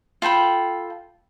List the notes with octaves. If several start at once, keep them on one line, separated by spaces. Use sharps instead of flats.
F4 A4 G5 B5